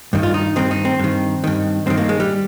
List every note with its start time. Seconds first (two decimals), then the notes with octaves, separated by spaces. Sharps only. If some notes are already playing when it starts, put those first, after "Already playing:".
0.13 G2 D#3
0.23 F4
0.34 D#4
0.56 G2 D#3 C4
0.71 D#4
0.85 C4
0.99 G2 D#3
1.44 G2 D#3
1.87 G2 D#3 C4
1.97 A#3
2.09 G#3
2.20 G3